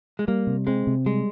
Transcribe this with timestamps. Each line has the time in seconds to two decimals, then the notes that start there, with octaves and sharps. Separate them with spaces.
0.19 G#3
0.28 G3 A#3
0.47 C3
0.67 G#3 C4
0.87 C3
1.06 G3 G#3